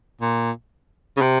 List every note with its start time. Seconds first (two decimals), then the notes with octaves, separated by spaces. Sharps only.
0.21 A#2
1.17 C#3
1.21 C3